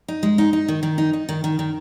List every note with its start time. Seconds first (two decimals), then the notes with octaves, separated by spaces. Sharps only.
0.08 D#4
0.23 G#3
0.38 D#4
0.53 D#4
0.68 D#3
0.83 D#3
0.98 D#4
1.13 D#4
1.29 D#3
1.44 D#3
1.59 D#3